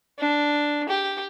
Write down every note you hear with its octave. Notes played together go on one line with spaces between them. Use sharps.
D4
G4